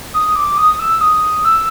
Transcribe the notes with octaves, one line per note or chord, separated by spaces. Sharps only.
D#6
D6
D#6
E6
D#6
E6